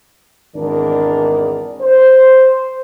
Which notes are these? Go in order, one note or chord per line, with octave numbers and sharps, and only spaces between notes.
G#1 E2 D#3 D4 A#4 D5
C5